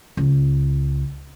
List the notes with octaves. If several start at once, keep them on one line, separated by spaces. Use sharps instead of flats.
C#2